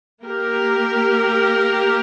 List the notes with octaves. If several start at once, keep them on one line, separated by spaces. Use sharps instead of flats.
A#3 G4 A#4